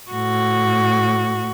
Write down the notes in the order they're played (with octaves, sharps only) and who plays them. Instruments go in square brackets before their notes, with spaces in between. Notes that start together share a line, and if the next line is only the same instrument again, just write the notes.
[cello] A2 F#4